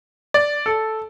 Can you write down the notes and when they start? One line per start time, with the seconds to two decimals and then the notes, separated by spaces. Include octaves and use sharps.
0.34 D5
0.66 A4